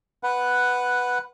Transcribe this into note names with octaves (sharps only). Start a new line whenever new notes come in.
B4 F#5